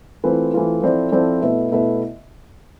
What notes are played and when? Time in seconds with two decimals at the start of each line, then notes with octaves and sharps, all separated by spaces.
0.24 E3 A3 C4 F4 B4
0.53 E3 A3 C4 F4 B4
0.82 F3 C4 E4 A4 D5
1.12 F3 C4 E4 A4 D5
1.42 B2 A3 E4 B4 E5
1.71 B2 A3 E4 B4 E5